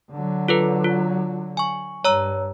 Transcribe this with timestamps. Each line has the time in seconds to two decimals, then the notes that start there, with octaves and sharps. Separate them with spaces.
0.12 D3 F#3
0.48 F4 A4 B4
0.84 F4
1.57 G#5 C#6
2.04 G2 C#5 A#5 E6